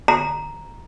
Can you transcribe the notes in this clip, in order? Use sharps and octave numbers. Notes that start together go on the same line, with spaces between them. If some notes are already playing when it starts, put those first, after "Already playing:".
A#5